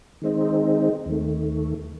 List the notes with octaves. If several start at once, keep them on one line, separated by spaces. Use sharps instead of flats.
D#3 G#3 C4 D#4
D#2 D#3 A3